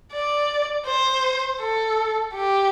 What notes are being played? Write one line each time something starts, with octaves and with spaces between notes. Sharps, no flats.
D5
C5
A4
G4